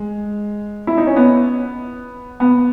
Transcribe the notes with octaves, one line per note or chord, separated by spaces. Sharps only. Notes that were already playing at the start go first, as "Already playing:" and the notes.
Already playing: G#3
E4
D#4
C#4
B3
B3